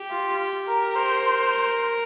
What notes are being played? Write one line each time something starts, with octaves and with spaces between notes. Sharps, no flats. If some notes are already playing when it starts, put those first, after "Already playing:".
Already playing: G4
F4
A#4
A#4 C5